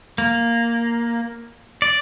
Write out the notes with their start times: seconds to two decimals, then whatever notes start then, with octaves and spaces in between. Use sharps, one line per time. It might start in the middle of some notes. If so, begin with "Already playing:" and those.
0.18 A#3
1.82 D5